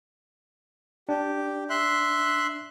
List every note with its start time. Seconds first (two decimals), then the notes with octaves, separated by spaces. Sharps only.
1.09 D4 G4
1.70 E5 C6 F#6